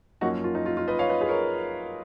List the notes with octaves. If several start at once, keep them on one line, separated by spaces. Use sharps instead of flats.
F#2 F3 A#3 C#4 D#4 F#4
F4
D#4
F4
F4
B4 D#5
C#5 F5
B4 D#5
G#4 B4
A#4 C#5